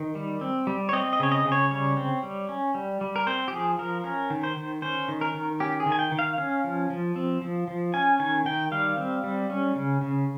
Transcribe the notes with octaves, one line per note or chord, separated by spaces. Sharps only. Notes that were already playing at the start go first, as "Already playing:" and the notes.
Already playing: D#3
G3
C4
G3
C#5
C4 D#5
D#5
C#3 C#5
D#5
C#3
C#5
G3 C#5
C4
G3
C#4
G3
G3
A#4
C4 C5
G4
F3 G#4
F3 A#4
C#4 A#4
D#3
C5
D#3
C#4 C5
D#3
A#4
D#3
C#4 G4
G#4
D#3
G#5
G5
D#3
F5
C#4 F5
F3
F3
C4
F3
F3
C#4 G#5
D#3 G#5
D#3 G5
G3 F5
C4
G3
C#4
C#3
C#3